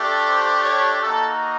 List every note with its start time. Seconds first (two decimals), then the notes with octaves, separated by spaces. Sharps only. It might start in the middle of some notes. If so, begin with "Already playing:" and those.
Already playing: A3 D4 G4
0.26 C5
0.64 C#5
1.02 A#3 D#4 F#4 A4